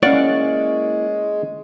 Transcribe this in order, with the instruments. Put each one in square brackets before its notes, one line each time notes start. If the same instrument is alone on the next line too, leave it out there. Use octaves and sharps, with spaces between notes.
[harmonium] G#3 [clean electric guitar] A#3 E4 C#5 [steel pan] C#4 F5 F#5 [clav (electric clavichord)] D5